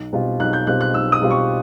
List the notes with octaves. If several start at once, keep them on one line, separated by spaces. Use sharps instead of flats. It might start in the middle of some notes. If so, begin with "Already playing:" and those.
Already playing: B1
B2 G3 C4 F4
B1 F#6
G6
B2 G3 C4 F4 F#6
F#6
B1 E6
D#6
B2 G3 C4 F4
C#6